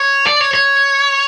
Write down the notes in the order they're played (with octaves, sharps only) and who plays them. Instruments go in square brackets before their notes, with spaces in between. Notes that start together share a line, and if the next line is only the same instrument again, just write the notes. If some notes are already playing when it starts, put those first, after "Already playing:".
Already playing: [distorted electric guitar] C#5
D5
C#5
C#5